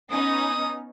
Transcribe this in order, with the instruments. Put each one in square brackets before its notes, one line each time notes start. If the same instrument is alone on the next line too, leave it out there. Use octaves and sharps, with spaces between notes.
[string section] B3 C#4 D#4 [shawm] D#6